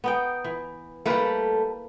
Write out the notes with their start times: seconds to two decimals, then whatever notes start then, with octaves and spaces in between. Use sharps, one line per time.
0.04 B3 D#4 G5
0.44 E3
1.06 G3 A3 A#3 E4 B4